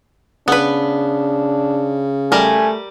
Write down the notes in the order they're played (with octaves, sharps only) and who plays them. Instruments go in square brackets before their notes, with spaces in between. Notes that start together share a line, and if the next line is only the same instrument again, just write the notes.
[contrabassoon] C#3 [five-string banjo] B3 B4 [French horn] D4
[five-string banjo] G3 A#4 [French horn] A3 [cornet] G#5